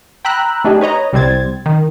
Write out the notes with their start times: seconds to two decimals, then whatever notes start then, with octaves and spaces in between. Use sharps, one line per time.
0.25 G5 A#5 B5 E6 F#6
0.64 A3 D4 D#4 G4 G#4
0.81 B4 C#5 D#5 A#5
1.13 C2 G3 C4 G#6 A6
1.66 D#3